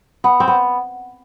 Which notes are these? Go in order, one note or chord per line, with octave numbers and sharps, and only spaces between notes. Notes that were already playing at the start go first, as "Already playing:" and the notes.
B3
C4
B3